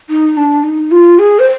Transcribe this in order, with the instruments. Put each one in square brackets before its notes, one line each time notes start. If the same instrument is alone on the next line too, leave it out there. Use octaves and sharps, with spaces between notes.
[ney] D#4
D4
D#4
F4
G#4
C5